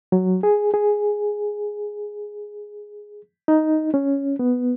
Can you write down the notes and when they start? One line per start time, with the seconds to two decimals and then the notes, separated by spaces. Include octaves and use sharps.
0.12 F#3
0.43 G#4
0.74 G#4
3.48 D#4
3.94 C#4
4.39 B3